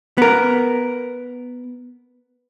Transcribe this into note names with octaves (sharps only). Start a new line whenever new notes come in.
B3 A#4